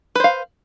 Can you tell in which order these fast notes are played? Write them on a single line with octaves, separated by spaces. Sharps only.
B4 C5 F5